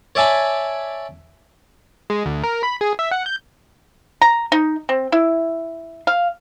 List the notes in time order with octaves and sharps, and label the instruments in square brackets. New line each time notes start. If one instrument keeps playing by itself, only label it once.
[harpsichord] C#5 D5 E5 G#5 A5 B5
[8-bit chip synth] G#3
D2
A#4
B5
G#4
E5
F#5
G6
[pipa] A#5
D#4
C4
E4
F5